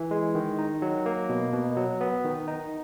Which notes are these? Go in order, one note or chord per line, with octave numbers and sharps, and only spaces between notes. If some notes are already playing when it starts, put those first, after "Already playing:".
Already playing: E3
G#3
D#3
D#4
F#3
A#3
B2
B2
F#3
B3
D#3
D#4